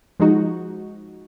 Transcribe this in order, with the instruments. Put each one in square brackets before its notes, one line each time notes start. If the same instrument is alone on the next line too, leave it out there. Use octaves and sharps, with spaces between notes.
[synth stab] F3 G#3 D#4 F#4